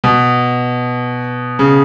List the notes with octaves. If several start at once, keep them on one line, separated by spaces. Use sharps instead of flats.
B2
C#3